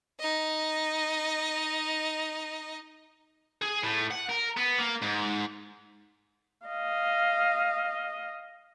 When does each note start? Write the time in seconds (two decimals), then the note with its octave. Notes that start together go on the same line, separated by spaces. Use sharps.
0.20 D#4 D#5
3.62 G#4
3.84 A2
4.11 F#5
4.29 A#4
4.57 B3
4.79 A#3
5.02 G#2
6.66 D#5 F5